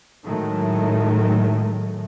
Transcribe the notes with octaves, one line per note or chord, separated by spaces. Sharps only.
A2 D#3 F#3 G#3 A3